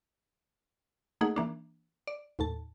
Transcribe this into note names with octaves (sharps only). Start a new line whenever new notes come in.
A3 A#3 D#4 G#4 F#5
E3 A#3 D4
D5
D#2 A2 A5